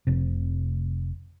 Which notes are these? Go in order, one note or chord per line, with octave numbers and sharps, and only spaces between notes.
F1 C3